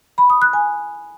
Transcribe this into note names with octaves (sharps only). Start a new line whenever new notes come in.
B5
D#6
F#6
G#5